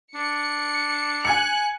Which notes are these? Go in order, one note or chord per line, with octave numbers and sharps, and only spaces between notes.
D4 C#7
G#5 F#6 G#6 C#7